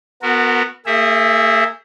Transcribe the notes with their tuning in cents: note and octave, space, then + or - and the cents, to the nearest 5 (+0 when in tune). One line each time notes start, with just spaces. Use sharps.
B3 +0 F#4 -25 A#4 -30
A#3 -45 G#4 -15 E5 +0